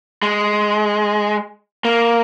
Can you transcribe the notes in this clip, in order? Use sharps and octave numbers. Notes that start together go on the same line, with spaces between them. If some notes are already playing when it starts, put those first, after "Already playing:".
G#3
A#3